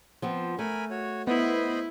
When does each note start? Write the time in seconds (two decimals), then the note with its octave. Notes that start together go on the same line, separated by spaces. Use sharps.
0.22 F3 B3 C4
0.59 A3 A#4 G#5 B5
0.90 F#4 C#5
1.27 B3 E4 C5 D#5 B5